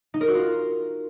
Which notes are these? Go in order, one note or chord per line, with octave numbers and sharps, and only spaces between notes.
D#4
A#4
F#4
F4